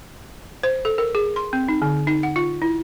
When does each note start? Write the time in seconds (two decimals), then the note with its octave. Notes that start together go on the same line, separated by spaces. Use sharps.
0.63 C5
0.85 A4
0.98 A#4
1.15 G#4
1.36 C6
1.53 C4
1.69 D#4
1.82 D3
2.07 D#4
2.23 F#5
2.36 F4
2.62 E4